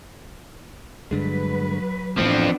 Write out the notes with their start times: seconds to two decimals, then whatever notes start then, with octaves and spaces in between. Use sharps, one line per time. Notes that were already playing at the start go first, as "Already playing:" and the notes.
1.11 G2 D3 F#3 G#3 B4
2.18 A2 E3 F3 A3 B3 C4 D4